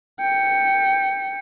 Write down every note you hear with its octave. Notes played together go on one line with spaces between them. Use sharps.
G5 C#7